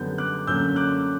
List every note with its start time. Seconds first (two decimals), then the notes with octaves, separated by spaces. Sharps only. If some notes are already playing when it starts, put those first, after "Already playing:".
Already playing: F#2 D3 G3 B3 G6
0.18 D6 F#6
0.47 F#2 D3 A#3 C#4 E6 G6
0.76 D6 F#6